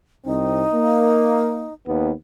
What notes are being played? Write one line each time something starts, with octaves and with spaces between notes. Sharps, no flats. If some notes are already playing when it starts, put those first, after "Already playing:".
C2 C4 D#4
A#3
D#2 B3